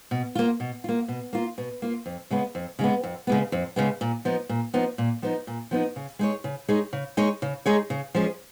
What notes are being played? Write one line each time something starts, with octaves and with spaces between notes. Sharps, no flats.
B2
A#3 F4
B2
A#3 F4
B2
A#3 F4
B2
A#3 F4
F2
C#3 G#3 B3
F2
C#3 G#3 B3
F2
C#3 G#3 B3
F2
C#3 G#3 B3
A#2
F3 B3 D#4
A#2
F3 B3 D#4
A#2
F3 B3 D#4
A#2
F3 B3 D#4
C#3
G#3 D#4 G#4 C#5
C#3
G#3 D#4 G#4 C#5
C#3
G#3 D#4 G#4 C#5
C#3
G#3 D#4 G#4 C#5
C#3
F3 G#3 C#4 G#4